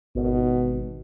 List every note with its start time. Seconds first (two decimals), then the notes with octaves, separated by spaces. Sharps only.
0.15 G#1 B2